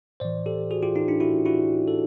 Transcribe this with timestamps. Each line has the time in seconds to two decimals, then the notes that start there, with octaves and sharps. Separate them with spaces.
0.20 A2 E3 C5 D5
0.46 G4 A4
0.71 F#4 G#4
0.83 F4 G4
0.95 D#4 F4
1.08 D4 E4
1.20 E4 F#4
1.45 E4 F#4
1.88 A4